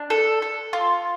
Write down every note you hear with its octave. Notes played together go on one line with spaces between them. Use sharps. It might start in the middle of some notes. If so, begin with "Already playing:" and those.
Already playing: D4
A4
A4
F4